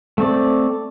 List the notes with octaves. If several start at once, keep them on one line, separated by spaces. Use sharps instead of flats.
A3 C4 D5